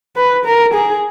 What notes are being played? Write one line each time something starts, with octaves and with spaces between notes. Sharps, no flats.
B4
A#4
G#4